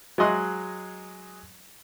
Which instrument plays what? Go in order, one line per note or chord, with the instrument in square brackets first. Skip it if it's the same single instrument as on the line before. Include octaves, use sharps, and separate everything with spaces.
[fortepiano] F#3 G#3 G#4 D#5 C6 F#6